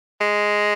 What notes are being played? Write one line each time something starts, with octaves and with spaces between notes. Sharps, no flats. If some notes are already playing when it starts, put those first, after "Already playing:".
G#3